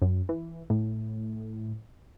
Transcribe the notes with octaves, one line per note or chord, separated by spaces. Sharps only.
F#2
E3
A2